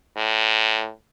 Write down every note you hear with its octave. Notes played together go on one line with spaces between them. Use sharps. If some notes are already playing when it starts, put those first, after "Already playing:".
A2